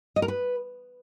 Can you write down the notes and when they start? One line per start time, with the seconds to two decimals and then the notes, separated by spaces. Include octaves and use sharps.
0.16 D#5
0.22 A#4
0.28 B4